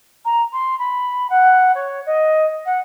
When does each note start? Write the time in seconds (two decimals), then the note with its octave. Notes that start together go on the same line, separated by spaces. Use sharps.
0.25 A#5
0.52 C6
0.79 B5
1.30 F#5
1.75 C#5
2.06 D#5
2.66 F#5